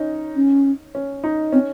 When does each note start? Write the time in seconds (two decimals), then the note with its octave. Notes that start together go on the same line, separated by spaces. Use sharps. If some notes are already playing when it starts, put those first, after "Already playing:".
Already playing: C#4 D#4
0.36 C#4
0.95 C#4
1.24 D#4
1.52 C4 C#4